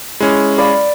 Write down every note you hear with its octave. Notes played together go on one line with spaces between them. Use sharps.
G#3 C#4 E4
D5 F5 B5